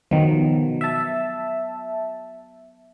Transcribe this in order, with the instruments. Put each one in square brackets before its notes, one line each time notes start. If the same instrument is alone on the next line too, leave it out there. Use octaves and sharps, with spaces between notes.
[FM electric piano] B2 D#3 F3 [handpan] F#3 B3
[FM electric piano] E5 A5